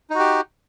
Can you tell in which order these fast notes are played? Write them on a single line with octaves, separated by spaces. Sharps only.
D#4 F#4 G4